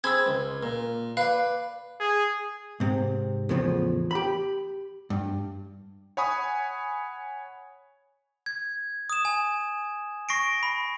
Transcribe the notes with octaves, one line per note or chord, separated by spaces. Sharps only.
C4 G#4 B5 E6 G#6
C#2
A#2
B4 D5 F5
G#4
G#2 C3
E2 A2 C#3 F3
G4 B5
G2
C#5 F#5 G#5 B5 C#6 D#6
G#6
D#6 E7
G#5
C#6 A#6 C7 D7
B5